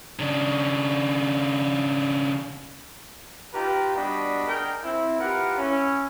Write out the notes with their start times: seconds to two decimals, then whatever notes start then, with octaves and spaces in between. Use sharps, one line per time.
0.19 C#3 D4
3.54 D#4 F4 G4 B4 G5 A#5
3.96 G3 B3 D4 F#4 D#5 B5
4.48 D4 G#4 A#4 G5
4.83 C4 E4
5.19 E4 F4 G4 A#4 B4 F#5
5.58 C#4 E4